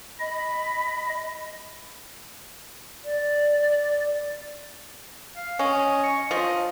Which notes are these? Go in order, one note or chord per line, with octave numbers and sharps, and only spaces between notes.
D#5 B5
D5
F5
C#4 D#5
C#6
F3 D#5